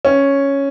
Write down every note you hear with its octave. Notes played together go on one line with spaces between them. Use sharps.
C#4